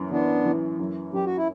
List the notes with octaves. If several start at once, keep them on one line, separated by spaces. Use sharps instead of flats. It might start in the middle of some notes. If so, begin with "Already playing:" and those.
Already playing: F#2 E3
E3 B3 D4
E3
F#2
F#2 G4
F#4
E4